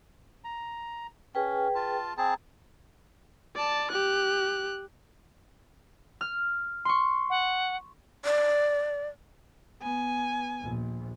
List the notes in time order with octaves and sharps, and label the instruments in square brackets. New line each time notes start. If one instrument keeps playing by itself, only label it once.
[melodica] A#5
[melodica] C#4 [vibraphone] G#4 B4 G5
[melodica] F4 A5
[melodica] C4 G#4 A5 [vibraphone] A#5
[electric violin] D5 A5
G4 F#6
[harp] F6
C6 C#6
[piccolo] F#5
[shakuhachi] D5
[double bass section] B3 [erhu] G#5
[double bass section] A#1 D#2